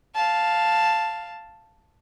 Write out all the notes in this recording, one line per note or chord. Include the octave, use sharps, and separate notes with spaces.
F5 A5